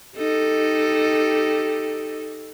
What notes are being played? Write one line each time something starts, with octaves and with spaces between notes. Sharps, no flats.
D#4 G4 A4